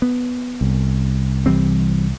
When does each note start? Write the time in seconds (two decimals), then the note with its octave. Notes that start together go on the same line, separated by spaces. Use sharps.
0.02 B3
0.61 C2
1.46 E3 G3 C4